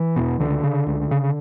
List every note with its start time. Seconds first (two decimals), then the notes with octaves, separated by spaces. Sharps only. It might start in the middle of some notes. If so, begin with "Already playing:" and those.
Already playing: E3
0.16 E2 B2
0.40 C#2 D3
0.63 C#3
0.87 C#2
1.11 C#3